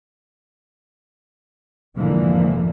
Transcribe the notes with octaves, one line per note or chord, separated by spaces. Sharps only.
F1 G#2 D3 E3 F3 A#3